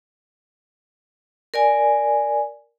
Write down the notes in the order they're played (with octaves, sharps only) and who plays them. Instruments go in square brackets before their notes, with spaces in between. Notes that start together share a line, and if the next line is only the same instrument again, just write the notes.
[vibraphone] A#4 D5 G#5